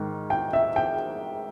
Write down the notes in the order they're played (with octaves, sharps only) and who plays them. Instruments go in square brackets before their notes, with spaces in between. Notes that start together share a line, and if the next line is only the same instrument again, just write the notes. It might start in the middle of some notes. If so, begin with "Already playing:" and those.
Already playing: [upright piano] G#2 D#3
G5
E5
G5